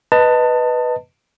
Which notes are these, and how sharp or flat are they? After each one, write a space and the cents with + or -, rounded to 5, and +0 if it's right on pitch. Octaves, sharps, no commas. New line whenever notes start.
B4 +0 D#5 +0 A5 +25